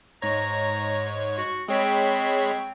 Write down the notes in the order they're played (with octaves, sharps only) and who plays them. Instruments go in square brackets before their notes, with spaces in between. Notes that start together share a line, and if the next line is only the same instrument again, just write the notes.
[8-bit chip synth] G#2 C#5 [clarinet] A#5
[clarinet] F#4
[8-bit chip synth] G#3 C#5 B5 [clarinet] C4